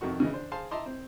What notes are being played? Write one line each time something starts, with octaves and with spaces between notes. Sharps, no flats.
F2 C3 D#3 F#4 C#6
C#3 E3 D#5
D4 C5
G#4 C5 F5 A5 C6
D#5 E5 A5 A#5 C6 D6
C4